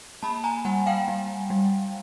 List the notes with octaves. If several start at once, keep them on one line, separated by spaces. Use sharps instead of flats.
A#3 A5 B5
G#5 A#5
G3 F#5 G#5
F5 G5
G3
G3